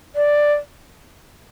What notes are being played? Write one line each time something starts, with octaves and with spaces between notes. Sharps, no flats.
D5